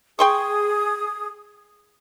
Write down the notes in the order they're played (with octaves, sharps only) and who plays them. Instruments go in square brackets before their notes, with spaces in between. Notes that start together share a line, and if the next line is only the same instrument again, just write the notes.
[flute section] G#4 D#6 [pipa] G5 C6 C#6